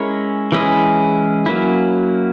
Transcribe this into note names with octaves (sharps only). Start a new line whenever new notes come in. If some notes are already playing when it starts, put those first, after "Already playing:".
Already playing: G#3 C#4 E4 A#4 C#5
E3 G#3 C#4 E4 G#4
F#3 A#3 C#4 E4